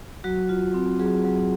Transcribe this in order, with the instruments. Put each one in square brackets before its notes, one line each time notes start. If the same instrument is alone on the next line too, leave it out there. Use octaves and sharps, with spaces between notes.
[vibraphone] F#3 F#4
F4
C4
F#3 G#4
F#3